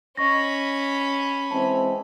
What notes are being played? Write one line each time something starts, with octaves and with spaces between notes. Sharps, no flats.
C#4 D#5 B5 C#6 A#6
E3 G#3 C4 A5